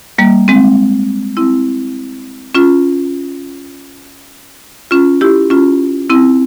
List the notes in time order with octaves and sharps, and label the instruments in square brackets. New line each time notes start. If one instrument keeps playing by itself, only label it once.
[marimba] G3 A#3
G#3 C4
C4 E4
C#4 F4
C#4 F4
E4 G4
C#4 F4
C4 E4